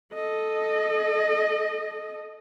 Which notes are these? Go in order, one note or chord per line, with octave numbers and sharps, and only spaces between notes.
A4 D#5